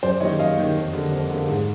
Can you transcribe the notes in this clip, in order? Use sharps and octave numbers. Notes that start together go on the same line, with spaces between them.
F#2 C5 D5
D#3 G3 A#3 C#5 D#5
F#2 D#5 F5
D#3 G3 A#3
F2
D3 G3 A#3
F2
D3 G3 A#3
G#2